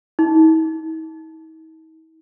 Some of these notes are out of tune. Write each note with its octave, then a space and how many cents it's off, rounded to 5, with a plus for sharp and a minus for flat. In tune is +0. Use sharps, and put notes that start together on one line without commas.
D#4 +45